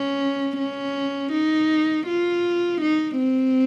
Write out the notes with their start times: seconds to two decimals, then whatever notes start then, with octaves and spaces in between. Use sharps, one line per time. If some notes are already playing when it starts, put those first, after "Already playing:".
Already playing: C#4
0.58 C#4
1.32 D#4
2.07 F4
2.81 D#4
3.17 C4